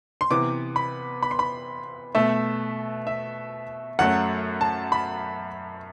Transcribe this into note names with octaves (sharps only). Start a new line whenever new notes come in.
C6
C3 E3 B3 D6
B5
B5
C6
B5
B2 A3 E5
E5
F#2 F#3 A3 F#5
A5
B5